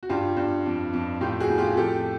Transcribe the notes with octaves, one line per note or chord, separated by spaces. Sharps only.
F#4
G2 F4 G4
G2
F2
F2
A2 F4 G4
F#4 G#4
A2
F4 G4
F2 G4 A4